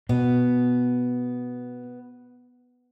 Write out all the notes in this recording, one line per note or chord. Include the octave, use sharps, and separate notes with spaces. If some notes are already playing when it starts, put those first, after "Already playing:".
B2 B3